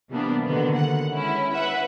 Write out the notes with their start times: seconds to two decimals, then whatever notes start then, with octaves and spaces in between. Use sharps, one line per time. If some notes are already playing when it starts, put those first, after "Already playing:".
0.10 C3 E3 G3 A#3 B3 D4
0.45 B2 D3 D#3 A#3 B3
0.77 F#5
1.12 G#3 C#4 E4
1.54 B4 E5 F#5